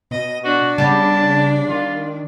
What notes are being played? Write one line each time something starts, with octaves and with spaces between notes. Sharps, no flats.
B2 D#5
D4 F#4
C#3 G3 B3 A5
D#3 F4